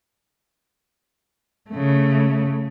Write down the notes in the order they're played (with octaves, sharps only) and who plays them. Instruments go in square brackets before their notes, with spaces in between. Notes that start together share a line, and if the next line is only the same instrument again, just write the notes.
[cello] C#3 A3